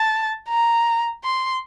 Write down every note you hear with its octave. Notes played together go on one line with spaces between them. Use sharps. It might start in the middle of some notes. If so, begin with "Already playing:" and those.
Already playing: A5
A#5
C6